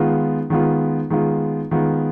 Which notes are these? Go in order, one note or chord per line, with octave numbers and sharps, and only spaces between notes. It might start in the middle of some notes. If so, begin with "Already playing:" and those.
Already playing: D#3 G#3 B3 F4
D#3 G#3 B3 F4
D#3 G#3 B3 F4
D#3 G#3 B3 F4